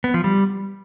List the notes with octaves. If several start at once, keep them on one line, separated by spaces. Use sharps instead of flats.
B3
F3
G3